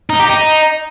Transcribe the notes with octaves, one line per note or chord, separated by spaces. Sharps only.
D#4
G4
D#4